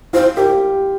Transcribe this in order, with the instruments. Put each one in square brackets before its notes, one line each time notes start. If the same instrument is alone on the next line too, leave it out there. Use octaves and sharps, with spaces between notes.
[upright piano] F4 [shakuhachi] C5
[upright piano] G4 [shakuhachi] A#4